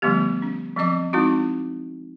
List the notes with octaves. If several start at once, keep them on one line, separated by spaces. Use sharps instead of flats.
D3 F3 G3 A3 B3 G4
C#4
F3 F#3 C4 D#5 D6
G#3 C4 D#4 E4 F#4